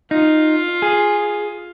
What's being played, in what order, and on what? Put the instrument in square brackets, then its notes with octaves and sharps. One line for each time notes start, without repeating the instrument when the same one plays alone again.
[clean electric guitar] D#4 [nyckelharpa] F4
[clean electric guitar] G#4